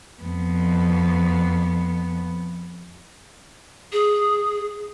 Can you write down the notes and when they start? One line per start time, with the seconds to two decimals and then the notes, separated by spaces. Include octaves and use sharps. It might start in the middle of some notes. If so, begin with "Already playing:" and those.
0.23 F2 B3
3.93 G#4